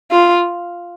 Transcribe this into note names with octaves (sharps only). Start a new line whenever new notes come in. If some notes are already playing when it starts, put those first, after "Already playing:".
F4